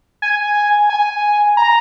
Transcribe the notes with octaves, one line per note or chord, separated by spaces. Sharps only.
G#5
G#5
A#5